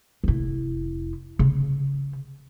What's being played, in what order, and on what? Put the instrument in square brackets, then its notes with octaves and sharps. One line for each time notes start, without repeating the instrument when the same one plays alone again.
[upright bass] F1 E4
C#3